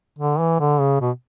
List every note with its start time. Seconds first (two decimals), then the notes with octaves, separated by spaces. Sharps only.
0.19 D3
0.39 E3
0.60 D3
0.80 C#3
1.01 B2